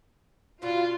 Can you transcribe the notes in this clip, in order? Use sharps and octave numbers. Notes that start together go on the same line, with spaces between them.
B2 D3 F4 F#4